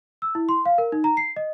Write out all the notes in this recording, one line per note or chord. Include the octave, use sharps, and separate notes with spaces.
E6
E4
C6
F5
A#4
D#4
A#5
C7
D#5